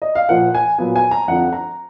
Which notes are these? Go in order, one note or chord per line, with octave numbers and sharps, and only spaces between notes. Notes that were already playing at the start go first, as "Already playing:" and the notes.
D#5
F5
A#2 F3 A#3 F4 F#5
G#5
A#2 F#3 B3 F4 G#5
G#5
A#5
F2 D3 F3 F#5
A#5